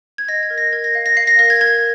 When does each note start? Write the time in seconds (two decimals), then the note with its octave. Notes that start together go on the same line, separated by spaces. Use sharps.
0.18 G#6
0.28 D#5 A#6
0.43 G#6
0.50 A#4
0.58 A#6
0.73 A#4 G#6
0.84 A#6
0.95 F5
1.06 A#6
1.17 F5 C7
1.27 A#6
1.39 A#4 A#6
1.50 G#6
1.61 A#4 G#6